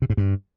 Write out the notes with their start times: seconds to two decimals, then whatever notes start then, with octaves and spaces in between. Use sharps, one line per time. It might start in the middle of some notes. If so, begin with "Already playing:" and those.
0.02 C3
0.10 G#2
0.17 G2